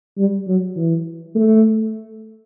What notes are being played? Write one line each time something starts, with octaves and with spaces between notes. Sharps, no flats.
G3
F#3
E3
A3